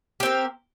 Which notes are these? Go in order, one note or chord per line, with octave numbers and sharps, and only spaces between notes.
C4 G4 A#4